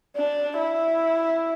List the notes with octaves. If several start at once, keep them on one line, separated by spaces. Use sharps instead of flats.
D4
E4